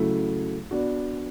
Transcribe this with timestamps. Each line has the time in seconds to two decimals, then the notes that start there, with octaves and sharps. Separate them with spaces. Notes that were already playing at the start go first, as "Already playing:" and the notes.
Already playing: C#3 F#3 A3 E4
0.71 B3 D4 F#4